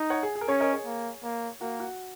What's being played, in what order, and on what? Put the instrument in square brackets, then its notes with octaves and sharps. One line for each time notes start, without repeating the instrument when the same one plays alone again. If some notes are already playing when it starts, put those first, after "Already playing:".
Already playing: [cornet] D#4
[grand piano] C#5 F#5
G#4
G#4
A#4
[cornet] C#4 [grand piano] G#4 C#5
[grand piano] A#4 D#5
G#4 C#5
[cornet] A#3
A#3
[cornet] A#3 [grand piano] F#4 A#4
[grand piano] F#4